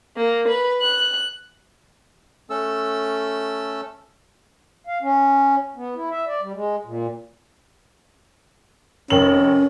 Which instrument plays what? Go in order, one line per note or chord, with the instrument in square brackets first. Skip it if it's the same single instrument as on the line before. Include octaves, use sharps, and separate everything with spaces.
[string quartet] A#3
B4
F#6
[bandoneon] A3 C#4 A4 E6
[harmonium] F5
C#4
B3
E4
E5
D5
G3
G#3
A#2
[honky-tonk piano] F1 D#3 F#7 [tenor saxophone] C#4